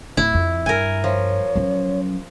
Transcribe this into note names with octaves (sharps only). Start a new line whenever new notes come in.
D1 E4
F2
G2 A#4 G#5
F3 C#5
F#3 C#4